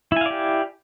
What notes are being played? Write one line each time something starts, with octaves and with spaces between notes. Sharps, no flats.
E4 G4 D5 F5 G#5